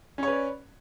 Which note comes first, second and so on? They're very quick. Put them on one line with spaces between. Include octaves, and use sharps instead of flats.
C#4 C#5 B4 D5